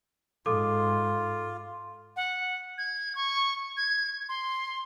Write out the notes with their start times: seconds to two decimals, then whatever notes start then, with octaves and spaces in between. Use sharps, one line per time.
0.46 G#2 F4 A4 D6
2.16 F#5
2.78 G#6
3.15 C#6
3.77 G#6
4.29 C6